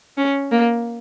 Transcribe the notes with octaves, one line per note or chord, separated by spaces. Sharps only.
C#4
A#3